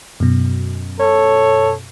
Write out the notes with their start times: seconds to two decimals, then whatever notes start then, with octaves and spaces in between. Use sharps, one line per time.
0.20 F#2 B2
1.00 A4 C#5